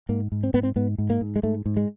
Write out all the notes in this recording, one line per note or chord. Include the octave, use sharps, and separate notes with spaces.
G#2 A#3
G#2
C4
G#2 B3
C4
G#2 B3
G#2
A#3
G#2
G#3
G#2 A3
G#2
G#3